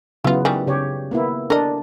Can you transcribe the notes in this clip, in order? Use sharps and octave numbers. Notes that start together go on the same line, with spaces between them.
C#3 F#3 B3 E4 F4
D#3 E3 G3
C#3 G4 C#5
A#3 B3 E4
D4 A#4 D#5